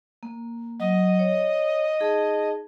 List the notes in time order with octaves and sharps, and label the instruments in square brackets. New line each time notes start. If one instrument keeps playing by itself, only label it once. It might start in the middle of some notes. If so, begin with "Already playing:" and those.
[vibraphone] A#3
[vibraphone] F#3 [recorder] D#5
[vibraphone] C#5
D#4 G#4 A5